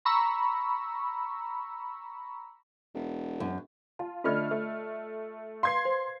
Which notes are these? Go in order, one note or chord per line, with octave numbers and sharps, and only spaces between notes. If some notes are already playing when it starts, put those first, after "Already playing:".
A#5 B5 C#6 E6
E1
F#2
F4 A5
D3 A3 F4 D5 D#5 F6
A3
B4 F5 C6 G#6 C7
C5